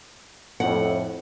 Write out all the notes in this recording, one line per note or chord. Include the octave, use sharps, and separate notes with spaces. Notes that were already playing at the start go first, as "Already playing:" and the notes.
F2 A2 F#5